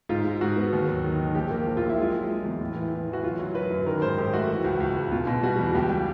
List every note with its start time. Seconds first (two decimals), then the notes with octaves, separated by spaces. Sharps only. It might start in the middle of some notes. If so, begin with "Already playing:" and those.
0.09 G#2 F4
0.25 G#3
0.41 G#2 F#4
0.57 B3
0.72 D#2
0.88 F#3
1.03 D#3
1.19 D#3
1.35 A#1 G4
1.51 A#3
1.66 A#1
1.77 F4
1.82 F#3
1.89 E4
1.98 G#3 F4
2.14 G#3
2.29 G#3
2.45 E2
2.61 A2
2.76 E3
2.92 E3
3.08 E3
3.13 F#4
3.23 F#3 F4
3.39 F#3
3.54 F#3 B4
3.71 F#2
3.86 D#3 A#4
4.02 G#2 C5
4.18 G#2 G4
4.33 A3 F#4
4.49 E3
4.64 C#2
4.80 C#2
4.97 C#2
5.12 B2 F4
5.27 B2
5.43 G3 F#4
5.59 E2
5.75 C#2 G4
5.90 G3